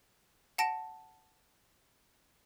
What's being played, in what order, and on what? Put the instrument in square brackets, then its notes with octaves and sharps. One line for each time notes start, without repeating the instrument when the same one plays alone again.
[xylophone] F#5 A5 A#6 D7